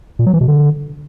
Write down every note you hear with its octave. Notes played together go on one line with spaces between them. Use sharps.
A#2
F#3
E3
B2
D3